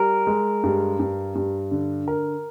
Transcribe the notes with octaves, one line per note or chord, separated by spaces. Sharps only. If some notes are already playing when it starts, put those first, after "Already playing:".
Already playing: G3 A#4
G#3
G2
G2
G2
D3
A#4